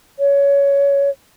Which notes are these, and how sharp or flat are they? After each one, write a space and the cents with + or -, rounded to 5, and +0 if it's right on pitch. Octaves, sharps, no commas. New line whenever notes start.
C#5 +20